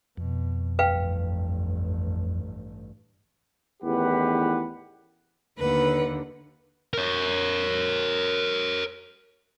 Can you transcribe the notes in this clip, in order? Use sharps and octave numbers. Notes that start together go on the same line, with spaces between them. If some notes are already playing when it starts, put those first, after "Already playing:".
F2 B2
A1 G2 B4 F5 G5
A1 E2 D#3 G4 B4 F#5
D#2 D3 B4 F#5
A#4 C#5